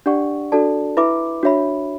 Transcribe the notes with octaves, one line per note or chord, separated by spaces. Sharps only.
D4 G4 D5 F#5 C#6
D4 F#4 A4 D5 A5
E4 B4 E5 B5 D6
D4 F#4 C#5 E5 B5